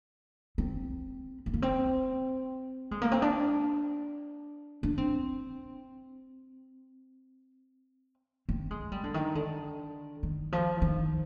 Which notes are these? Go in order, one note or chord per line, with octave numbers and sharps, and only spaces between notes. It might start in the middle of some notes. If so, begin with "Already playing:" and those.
C4
C4
A#3
C4
G#3
A#3
C4
D4
D4
C4
C4
G#3
G3
D3
D#3
D3
D#3
F3
D#3